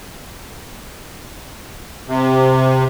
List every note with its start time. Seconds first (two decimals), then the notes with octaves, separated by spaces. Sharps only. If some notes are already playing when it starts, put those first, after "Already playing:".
2.07 C3